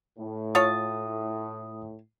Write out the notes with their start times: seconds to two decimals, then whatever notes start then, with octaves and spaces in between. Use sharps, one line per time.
0.19 A2
0.55 F4 C#5 A5 D#6